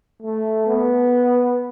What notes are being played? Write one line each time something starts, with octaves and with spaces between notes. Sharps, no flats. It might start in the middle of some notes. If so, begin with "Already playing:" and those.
A3
B3